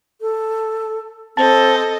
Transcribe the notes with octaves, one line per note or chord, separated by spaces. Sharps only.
A4
C4 A4 D#5 A5